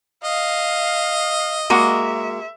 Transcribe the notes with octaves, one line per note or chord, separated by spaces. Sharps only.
D#5 F5
G#3 A#3 F#4 E5